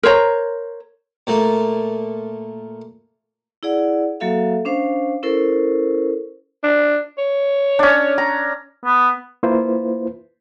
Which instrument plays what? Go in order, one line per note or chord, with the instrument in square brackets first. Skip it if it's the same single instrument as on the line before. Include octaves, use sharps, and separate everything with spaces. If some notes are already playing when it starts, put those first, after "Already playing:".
[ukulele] A#4 C5 C#5 A#5
[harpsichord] A#2 A3 A#3
[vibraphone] E4 G#4 D5 F#5
F#3 A#3 F#4 A4 E5 F5
C#4 D4 C5 F5
C#4 E4 A4 A#4 C5
[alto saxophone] D4
C#5
[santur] C#4 D4
A#5
[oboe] B3
[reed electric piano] A#3 E4 F4 B4 C5